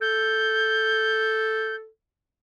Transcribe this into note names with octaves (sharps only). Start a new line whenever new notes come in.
A4 G6